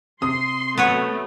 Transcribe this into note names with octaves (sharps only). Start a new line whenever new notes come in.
C3 C6 D#6
F#3 A3 B3 B4 C#5